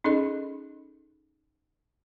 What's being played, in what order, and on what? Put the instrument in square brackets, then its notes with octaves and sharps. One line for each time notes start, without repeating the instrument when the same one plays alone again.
[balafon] C#4 D#4 G#4 A4 D#5